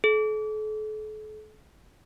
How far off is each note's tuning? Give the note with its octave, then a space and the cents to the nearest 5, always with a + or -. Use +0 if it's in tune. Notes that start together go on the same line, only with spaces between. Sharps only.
A4 -40